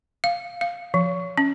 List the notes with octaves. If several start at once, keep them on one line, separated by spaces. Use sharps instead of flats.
F5
F5
F3
C#4